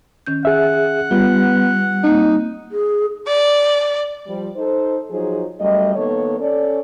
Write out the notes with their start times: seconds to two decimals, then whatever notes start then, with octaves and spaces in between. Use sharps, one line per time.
0.26 D#3 C#4 G6
0.45 G#4 E5 F#5
1.11 G3 B3 F4
2.03 A#3 C4 D#4
2.72 G#4
3.27 D5
4.28 F3 G3
4.57 D#4 A4 C5
5.10 F3 F#3 D#4 G#4
5.60 F#2 G3 A3 D#5
5.96 D#3 A#3 B3 A4 C#5
6.40 C#4 A4 D5